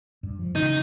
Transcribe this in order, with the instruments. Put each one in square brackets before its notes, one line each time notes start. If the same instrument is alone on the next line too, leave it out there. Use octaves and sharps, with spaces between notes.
[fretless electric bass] G2
F3
[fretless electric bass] C#3 E3 [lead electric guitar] D#4